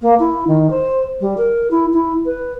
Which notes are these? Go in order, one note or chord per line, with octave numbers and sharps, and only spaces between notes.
A#3
E4
D#3
C5
G3
A#4
E4
E4
B4